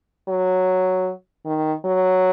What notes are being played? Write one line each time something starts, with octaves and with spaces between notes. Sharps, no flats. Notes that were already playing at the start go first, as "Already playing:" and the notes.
F#3
D#3
F#3